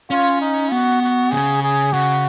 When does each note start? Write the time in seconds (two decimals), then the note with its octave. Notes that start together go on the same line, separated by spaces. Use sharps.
0.10 C#4 F4
0.41 D#4
0.71 B3 F#4
1.02 F#4
1.32 C#3 G#4
1.62 G#4
1.93 C#3 F#4